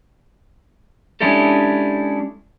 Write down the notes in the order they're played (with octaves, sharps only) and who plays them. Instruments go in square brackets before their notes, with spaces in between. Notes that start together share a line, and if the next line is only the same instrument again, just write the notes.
[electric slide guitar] G#3 C#4 D4 E4 G4 A4